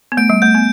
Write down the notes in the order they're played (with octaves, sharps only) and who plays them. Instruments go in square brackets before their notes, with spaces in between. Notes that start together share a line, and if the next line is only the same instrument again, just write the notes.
[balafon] B3
[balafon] A3 [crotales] D7
[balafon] G3
[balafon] A3 [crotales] G6
[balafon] B3